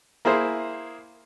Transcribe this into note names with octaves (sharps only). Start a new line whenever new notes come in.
A#3 E4 G#4 C5